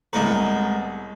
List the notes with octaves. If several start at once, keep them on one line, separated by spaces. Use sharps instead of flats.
C2 A2 G#3 B3 E4 B4 E5 A#5